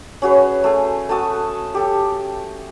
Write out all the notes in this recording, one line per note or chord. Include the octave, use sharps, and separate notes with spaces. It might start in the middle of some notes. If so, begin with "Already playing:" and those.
C#4 F#4 G#4 B4
A3 G#4 G#5
A3 F#4 A5 D#6
G4 A4